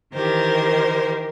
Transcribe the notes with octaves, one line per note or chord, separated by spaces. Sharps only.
D#3 E3 G4 A#4 C5